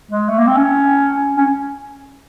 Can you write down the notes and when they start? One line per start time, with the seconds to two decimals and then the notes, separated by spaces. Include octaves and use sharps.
0.11 G#3
0.29 A3
0.38 A#3
0.47 C4
0.57 C#4
1.37 C#4